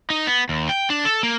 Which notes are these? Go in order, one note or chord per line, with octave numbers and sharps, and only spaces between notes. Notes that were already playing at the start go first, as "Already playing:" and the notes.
D#4
B3
D#2
G5
D4
A4
A#3